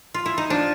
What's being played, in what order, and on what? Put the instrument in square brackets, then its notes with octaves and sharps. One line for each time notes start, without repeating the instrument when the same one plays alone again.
[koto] F4
E4
D#4
[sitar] F3 [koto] D4